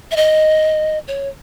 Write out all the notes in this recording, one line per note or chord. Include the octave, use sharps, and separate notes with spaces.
E5
D#5
C#5